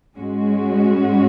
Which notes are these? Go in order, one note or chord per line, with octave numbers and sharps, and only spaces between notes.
G#2 G#3 C#4 F#4